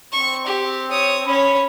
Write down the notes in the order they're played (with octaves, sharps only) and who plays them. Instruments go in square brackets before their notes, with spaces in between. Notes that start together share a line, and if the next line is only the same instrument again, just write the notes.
[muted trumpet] C4 [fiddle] C#6
[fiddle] G4
C#5 D#6
[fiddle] C#4 C#5 [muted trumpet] B5